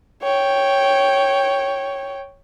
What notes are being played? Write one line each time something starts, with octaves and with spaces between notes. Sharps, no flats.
C#5 G5